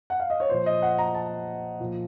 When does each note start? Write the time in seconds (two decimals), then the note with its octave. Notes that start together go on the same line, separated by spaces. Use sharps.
0.10 F#5
0.20 F5
0.30 D#5
0.40 C#5
0.49 A#2 F3 C5
0.66 D#5
0.82 F#5
0.98 A#5
1.14 A5
1.80 A#2 F3